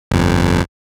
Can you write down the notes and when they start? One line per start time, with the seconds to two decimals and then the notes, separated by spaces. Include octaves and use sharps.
0.11 G1 F2